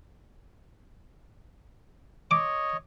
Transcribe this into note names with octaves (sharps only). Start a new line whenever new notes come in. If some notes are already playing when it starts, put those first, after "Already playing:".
C#5 D#5 D6